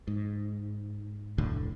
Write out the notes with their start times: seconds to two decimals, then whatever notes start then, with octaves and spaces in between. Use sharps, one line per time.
0.08 G#2
1.38 F1 D2 A2 D3